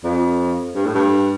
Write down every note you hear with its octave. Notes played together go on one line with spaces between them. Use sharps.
F2
G2
A2
G2